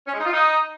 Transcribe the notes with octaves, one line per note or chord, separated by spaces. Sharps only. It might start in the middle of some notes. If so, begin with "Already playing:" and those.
C#4
G#3
D#4
F4
D#4